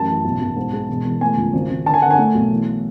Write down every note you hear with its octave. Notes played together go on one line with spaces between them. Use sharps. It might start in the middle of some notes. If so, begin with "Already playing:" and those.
Already playing: A1 F#2 A5
E3
B1
B1
G#2
G#3
E1
E2
A3 G#5
C#2
G#1
G#1
D3 A5
G#5
D3 F#5
G#5
A3
B1
E3